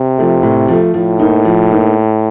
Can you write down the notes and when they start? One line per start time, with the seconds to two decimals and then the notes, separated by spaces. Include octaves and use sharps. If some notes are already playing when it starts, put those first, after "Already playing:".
Already playing: C3
0.18 F3 A3
0.43 A2
0.68 F3 A3
0.94 A2 F3
1.19 A#3 D#4
1.45 F3
1.71 A#3 D#4